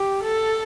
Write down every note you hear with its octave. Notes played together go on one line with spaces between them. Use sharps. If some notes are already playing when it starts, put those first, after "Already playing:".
Already playing: G4
A4